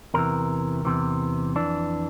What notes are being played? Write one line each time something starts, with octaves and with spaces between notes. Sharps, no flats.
E2 C3 E3 A#4
E2 C3 E3
F2 E3 D4